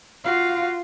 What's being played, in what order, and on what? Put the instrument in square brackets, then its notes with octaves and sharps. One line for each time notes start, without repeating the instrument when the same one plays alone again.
[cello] F4 [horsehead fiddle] F#4 F5